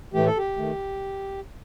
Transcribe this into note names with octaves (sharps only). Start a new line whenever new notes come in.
A2 E3 A3 G4
A4
G4
D#3 A3